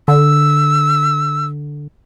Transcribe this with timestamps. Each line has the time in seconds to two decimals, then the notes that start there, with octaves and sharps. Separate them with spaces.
0.08 D3 E6